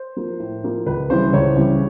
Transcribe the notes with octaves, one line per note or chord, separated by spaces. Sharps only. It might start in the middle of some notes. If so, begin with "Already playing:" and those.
Already playing: C5
F3 A#3
A2
F3 A#3
C#2 B4
C#3 E3 G3 C5
C#2 C#5
C#3 E3 G3